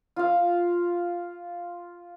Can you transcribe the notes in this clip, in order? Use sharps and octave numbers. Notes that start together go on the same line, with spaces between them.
F4 F5